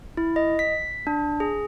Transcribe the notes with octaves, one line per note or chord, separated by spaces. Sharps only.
E4
D#5
B6
D4
G#4